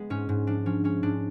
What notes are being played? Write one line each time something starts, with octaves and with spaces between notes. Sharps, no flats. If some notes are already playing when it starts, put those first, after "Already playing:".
Already playing: G#3 B3
G#2 C#4
G#2
F3 D4
F3 C#4
G#3 C#4
G#2 D4